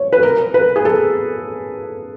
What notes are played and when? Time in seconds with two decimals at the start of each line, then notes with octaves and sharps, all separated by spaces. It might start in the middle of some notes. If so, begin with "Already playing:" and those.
Already playing: C#5
0.13 B4
0.23 A#4
0.54 B4
0.76 G#4
0.85 A4